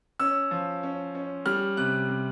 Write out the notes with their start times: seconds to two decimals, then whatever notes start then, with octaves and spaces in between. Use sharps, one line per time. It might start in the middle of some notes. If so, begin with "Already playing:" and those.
0.19 C#4 E6
0.51 F3
0.83 C#4
1.15 C#4
1.46 G3 F6
1.77 C3 F#6
2.09 C3